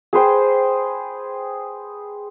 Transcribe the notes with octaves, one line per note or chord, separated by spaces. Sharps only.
G#4 B4 C5 G5